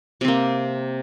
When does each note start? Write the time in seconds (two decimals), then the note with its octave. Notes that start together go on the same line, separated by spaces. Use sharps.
0.21 C3
0.25 C4
0.28 A#3